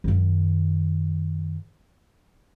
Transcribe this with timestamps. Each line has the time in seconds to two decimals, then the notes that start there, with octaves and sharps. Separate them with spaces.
0.04 F#2 D#3